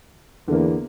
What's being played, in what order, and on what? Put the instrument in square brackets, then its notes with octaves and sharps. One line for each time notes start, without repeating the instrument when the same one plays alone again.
[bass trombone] E2 [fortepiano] D3 A#3